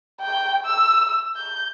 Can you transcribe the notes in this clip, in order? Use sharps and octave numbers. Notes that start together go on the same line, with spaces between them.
G5
E6
G6